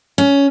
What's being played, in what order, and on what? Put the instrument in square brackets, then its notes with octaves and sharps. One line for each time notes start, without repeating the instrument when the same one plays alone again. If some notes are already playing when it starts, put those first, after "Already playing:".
[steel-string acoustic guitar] C#4